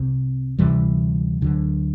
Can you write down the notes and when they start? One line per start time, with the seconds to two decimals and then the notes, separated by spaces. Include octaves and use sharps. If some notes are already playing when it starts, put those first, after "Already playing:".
Already playing: C2 C3 C4
0.58 D2 C3 E3 G3
1.41 D2 D3 F#3